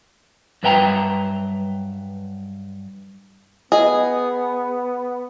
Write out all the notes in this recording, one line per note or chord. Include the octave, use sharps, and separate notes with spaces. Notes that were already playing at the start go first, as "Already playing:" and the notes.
G2 F#3 B4 E5 G5 A#5
B3 G#4 D#5